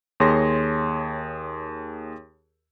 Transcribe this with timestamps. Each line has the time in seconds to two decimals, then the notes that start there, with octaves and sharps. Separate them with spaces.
0.20 D#2 G#4 C#5 C6 A#6